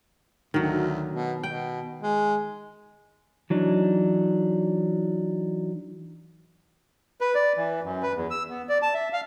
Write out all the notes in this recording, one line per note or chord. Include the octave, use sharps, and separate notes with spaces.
D2 D#3 F#3
B2
B2 G5
G#3
E3 F#3 D4 D#4
B4
D5
E3
F#2
B4
E2
E6
B3
D5
A5
E5
F5